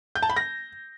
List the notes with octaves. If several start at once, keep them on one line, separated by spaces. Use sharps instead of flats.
G6
A5
B5
A#6